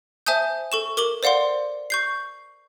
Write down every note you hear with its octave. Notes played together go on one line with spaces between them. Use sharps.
C5 E5 G#5 A5 D#6 G6
A4 C#6 E7
A#4 D6 F#7 G7
C5 D5 F5 F#5 C6
C#6 G6 C7